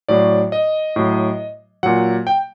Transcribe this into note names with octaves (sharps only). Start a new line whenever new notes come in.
A2 F#3 D5
D#5
A2 F#3
A#2 F#3 F#5
G5